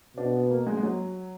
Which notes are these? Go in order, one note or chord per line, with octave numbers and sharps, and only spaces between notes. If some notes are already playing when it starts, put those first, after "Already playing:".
B2 D4
B3
A#3
G#3
G#3
F#3